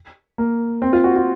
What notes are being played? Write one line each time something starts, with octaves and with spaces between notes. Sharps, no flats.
A#3
C4
F4
F#4
F4